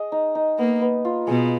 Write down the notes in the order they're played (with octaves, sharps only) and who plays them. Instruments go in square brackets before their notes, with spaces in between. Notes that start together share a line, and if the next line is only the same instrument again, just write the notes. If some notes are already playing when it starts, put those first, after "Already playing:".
Already playing: [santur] G#4 D#5
D#4
D#4
[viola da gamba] A#3 [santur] B3
[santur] B3
F4
[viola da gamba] B2 [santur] G#4